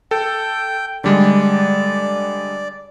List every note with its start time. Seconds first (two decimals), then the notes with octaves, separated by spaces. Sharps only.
0.11 A4 G5
1.04 D3 G3 G#3 D5